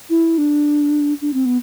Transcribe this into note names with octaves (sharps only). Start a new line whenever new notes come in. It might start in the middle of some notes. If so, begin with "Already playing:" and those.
E4
D4
D4
C4
B3